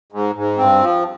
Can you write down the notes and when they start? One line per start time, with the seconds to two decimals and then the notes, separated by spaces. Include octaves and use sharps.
0.12 G#2
0.35 G#2
0.57 G2 C4
0.80 F3